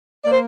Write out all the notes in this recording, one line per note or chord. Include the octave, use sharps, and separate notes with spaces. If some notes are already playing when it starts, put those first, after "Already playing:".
A#3 D5
C5